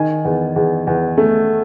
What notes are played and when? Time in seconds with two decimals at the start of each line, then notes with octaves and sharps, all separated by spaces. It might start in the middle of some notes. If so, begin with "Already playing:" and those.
Already playing: D#3 G#5
0.25 E2
0.56 E2
0.87 E2
1.18 A3